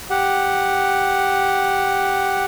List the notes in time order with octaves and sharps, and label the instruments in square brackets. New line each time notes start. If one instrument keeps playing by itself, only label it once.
[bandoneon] G4 F#5